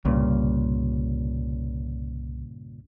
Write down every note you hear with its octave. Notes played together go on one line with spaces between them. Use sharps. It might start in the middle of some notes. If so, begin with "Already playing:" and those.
C2 G2 A#2 C#3